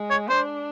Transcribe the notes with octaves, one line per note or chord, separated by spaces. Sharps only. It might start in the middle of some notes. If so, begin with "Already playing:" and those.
Already playing: G#3
C#5
D4 C5